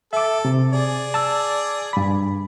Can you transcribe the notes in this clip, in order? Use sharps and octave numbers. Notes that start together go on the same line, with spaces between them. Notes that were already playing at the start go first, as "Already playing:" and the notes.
A4 E5 D6
C3
G#4 D5
A5 E6
G2 B5